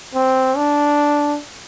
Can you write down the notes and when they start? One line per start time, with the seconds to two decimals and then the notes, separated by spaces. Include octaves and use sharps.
0.15 C4
0.57 D4